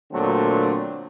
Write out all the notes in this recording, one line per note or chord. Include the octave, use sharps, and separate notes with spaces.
A#2 D3 F#3 A3 C4